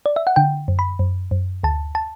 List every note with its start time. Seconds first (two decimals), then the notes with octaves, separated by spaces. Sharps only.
0.06 D5
0.16 E5
0.27 F#5
0.36 D3 G5
0.68 F#2
0.79 B5
0.99 F#2
1.31 F#2
1.63 D2 A5
1.95 A5